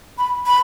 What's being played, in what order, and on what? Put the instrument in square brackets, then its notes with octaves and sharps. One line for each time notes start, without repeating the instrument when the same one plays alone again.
[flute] B5
B5